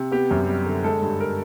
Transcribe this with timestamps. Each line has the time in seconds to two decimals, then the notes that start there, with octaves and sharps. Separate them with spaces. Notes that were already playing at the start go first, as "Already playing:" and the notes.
Already playing: C3
0.12 B3 G4
0.31 F#2
0.48 G3
0.66 D3
0.84 G#3 A4
1.02 G2
1.21 A#4